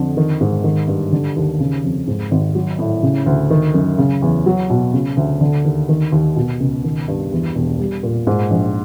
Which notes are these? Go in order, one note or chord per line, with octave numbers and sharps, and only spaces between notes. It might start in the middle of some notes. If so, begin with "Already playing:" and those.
Already playing: F2 D3
D#3
G#2
D#3
G2
D3
D#2
C#3
F2
G#2
G#1
F#3
A2
C#3
D2
D#3
F#2
C#3
E2
F#3
B2
C#3
D2
D3
D#2
D#3
D#2
B2
C#2
D#3
G2
E2
E1
G3
A#2
G#2
A#1